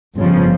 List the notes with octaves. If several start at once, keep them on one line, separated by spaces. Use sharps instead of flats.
G1 F2 C#3 F3